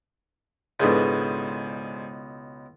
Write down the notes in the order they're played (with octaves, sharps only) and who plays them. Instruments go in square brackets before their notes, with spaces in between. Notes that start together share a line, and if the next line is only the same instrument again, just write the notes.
[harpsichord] C#2 B2 [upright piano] G#2 G#3 D4 [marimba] E4 A4 B4